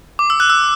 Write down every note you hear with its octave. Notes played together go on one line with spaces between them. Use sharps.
D6
E6
F#6
E6